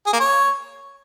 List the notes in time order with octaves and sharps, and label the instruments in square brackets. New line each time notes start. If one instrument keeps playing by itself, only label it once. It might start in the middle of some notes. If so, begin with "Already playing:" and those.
[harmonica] G#4
A#3
C#5